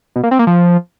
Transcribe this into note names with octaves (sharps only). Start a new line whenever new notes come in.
B2
A#3
C4
A#3
F3